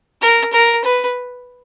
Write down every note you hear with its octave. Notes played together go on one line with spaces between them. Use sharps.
A#4
A#4
B4